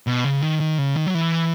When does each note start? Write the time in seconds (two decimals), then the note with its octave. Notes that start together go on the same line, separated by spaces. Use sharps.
0.07 B2
0.24 C#3
0.42 D#3
0.61 D#3
0.78 C#3
0.96 D#3
1.06 F#3
1.14 E3